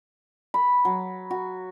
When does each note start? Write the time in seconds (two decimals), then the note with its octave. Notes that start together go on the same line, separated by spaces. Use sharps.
0.54 B5
0.85 F#3
1.31 F#4